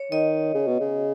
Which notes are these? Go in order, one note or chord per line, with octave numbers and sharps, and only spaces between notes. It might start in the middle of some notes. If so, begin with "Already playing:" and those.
Already playing: C#5
D#3 D#5
C#3
B2
C#3